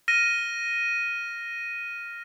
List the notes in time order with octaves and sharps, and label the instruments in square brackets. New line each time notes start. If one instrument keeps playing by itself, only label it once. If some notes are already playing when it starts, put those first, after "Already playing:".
[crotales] F6 A#6 D#7